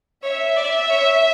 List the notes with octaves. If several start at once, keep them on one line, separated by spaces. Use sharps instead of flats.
C#5 E5
D5
C#5